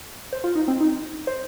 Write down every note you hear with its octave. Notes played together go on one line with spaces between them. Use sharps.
C5
F4
D#4
C4
D#4
C5